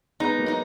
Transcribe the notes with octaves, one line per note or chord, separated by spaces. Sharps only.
G#3 B3 D#4
F#3 A#3
D#4